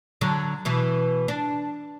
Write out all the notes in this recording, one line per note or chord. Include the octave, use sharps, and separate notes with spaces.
D3 F#3
B2 E3
D4